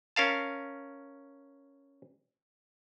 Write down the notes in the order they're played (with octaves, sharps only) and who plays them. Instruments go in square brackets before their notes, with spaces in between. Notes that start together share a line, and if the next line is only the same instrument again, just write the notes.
[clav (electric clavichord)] C#4 A#4 F5 A5